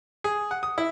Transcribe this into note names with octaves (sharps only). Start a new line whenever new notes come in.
G#4
F#5
D#6
E4